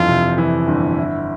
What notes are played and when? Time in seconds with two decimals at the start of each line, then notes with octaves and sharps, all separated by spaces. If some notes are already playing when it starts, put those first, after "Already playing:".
Already playing: G1 F2 E3 F4
0.08 C3
0.38 E3
0.68 G1
0.98 E4